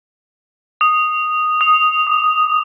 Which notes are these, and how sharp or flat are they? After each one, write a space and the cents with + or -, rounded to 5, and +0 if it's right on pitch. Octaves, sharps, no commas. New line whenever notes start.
D#6 -5
D#6 +5
D6 +35